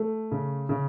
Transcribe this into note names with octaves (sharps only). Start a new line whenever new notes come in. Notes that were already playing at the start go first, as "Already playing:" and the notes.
Already playing: A3
C#3
C#3